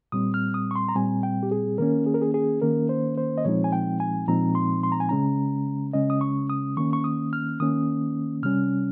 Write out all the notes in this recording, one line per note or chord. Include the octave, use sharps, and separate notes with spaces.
A#2 G3 C4 D#6
F6
D#6
C#6
C6
A#5
A#2 G3 C4 G#5
G5
G4
G#4
D#3 A#3 C#4 A#4
G#4
A#4
G#4
G#4
D#3 A#3 C#4 A#4
C5
C5
D#5
A#2 F3 G#3 C4 D#4 C#5
G#5
G5
G#5
A#2 F3 G#3 C4 D#4 A#5
C6
C6
A#5
G#5
C#3 G#3 C#4 A#5
C#3 G#3 C#4 D#5
D#6
C#6
D#6
D#3 A#3 C#4 C#6
C#6
D#6
F6
D#3 A#3 C#4 D#6
C3 G3 C#4 F6